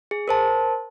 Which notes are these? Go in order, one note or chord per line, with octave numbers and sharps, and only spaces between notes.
G#4
A#4 C5 A5